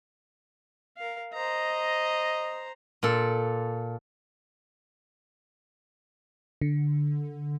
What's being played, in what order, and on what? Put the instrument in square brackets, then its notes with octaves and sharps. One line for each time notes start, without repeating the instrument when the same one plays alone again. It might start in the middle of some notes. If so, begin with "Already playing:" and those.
[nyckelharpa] A#4 F5
[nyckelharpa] C5 A#5 [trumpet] D#5
[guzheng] A#2 A4
[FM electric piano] D3